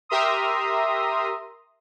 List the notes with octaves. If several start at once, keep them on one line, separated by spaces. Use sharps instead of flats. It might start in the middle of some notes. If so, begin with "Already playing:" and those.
G4 A#4 E5 A#5 C6 D#6